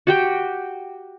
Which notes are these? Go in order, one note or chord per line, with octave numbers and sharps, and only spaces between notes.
F#4 G4 G5